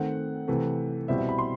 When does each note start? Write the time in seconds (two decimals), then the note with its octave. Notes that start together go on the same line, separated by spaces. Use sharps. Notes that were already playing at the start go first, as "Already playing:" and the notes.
Already playing: D#3 A3 C4 F#5
0.48 C3 E3 A3
1.08 B2 G3 C4 E4 E5
1.18 E5
1.29 B5
1.38 C6